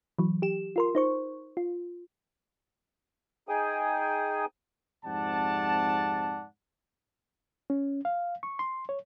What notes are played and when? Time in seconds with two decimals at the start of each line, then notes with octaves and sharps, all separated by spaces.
0.19 E3 F#3
0.42 G4 E7
0.76 F4 A#4 C6
0.95 D#4 C5 C#6
1.57 F4
3.49 D#4 G#4 G5 G#5 D#6
5.05 F2 G#2 C3 D5 F#5 A5
7.70 C#4
8.05 F5
8.43 C#6
8.59 C6
8.89 C#5